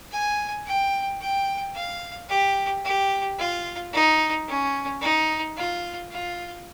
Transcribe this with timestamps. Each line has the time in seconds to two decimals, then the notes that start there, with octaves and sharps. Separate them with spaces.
0.11 G#5
0.66 G5
1.20 G5
1.75 F5
2.29 G4
2.84 G4
3.39 F4
3.93 D#4
4.48 C#4
5.02 D#4
5.57 F4
6.11 F4